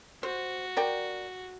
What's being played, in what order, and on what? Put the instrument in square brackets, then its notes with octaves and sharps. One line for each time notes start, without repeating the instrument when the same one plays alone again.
[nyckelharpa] F#4 [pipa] C5
[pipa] A#4 D5 G5